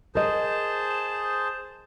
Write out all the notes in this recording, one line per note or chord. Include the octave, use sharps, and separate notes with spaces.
G#4 A#4 C5 D#5 A5